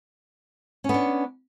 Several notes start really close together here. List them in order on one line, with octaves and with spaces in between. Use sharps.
C#4 B3 D4